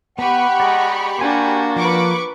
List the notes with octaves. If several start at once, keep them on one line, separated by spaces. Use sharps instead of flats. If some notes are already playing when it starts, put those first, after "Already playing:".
B3 G4 B4 F#5 B5 C#6
G#3 D5 D#5 A#5
A#3 D4 F#4 G5 G#5 C6
F3 B4 C#6 D6